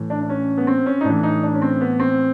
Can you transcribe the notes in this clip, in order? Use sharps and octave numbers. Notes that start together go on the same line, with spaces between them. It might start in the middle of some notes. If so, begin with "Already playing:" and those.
Already playing: A2 E3
D4
D4
C#4
B3
C4
C#4
D#4
A2 E3 D4
D#4
D4
C#4
C4
B3
C4